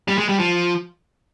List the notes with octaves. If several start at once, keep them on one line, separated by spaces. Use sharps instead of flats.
G3
G#3
G3
F3